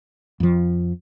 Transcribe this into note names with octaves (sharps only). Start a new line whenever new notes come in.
F2 F3